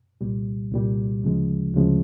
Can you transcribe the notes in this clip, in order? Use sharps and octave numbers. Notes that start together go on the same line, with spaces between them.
C2 A#2 G3
C2 A#2 G3
D2 C#3 F3 G#3
D2 C#3 F3 G#3